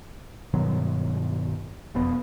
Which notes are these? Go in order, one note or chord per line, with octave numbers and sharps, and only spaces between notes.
G2 B2 D#3 F#3
E1 F2 B2 B3